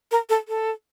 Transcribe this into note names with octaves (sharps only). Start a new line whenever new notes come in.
A#4
A4
A4